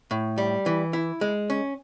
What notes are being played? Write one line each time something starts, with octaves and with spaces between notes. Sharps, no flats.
A2
G3
E3
E4
G#3
C#4